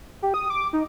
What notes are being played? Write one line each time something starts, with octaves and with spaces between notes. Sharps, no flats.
G4
D#6
D6
D#4